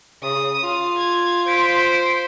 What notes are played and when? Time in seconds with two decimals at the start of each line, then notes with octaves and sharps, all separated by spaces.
0.23 C#3 D#6
0.63 F4
0.98 G#6
1.48 C5 B6 D7